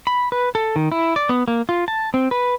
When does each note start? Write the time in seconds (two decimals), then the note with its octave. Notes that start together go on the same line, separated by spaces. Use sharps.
0.07 B5
0.32 B4
0.55 A4
0.76 D#3
0.92 E4
1.16 D5
1.29 B3
1.48 A#3
1.69 F4
1.88 A5
2.14 C4
2.31 B4